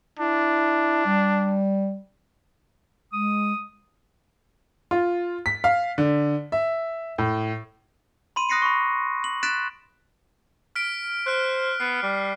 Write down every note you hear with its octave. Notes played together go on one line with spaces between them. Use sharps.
D4 E4
G3
G#3 D#6
F4
B6
F5
D3
E5
A2
B5 C6 D#7
D#6 F#6 A#6 C7 C#7 D#7
B5 C#6
F#7
F#6 A6 B6 D7 E7
F6 B6 D7
C5 F6 F#6
B3 C7
G3